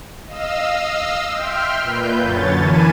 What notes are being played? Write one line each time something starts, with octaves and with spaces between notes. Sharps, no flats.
D#5 F5 E6
E5 G5 C6 F6
A#2 B4 G6
F#2 D3 C#5 A6
E3 A#3 G#5 A5 B5 D#7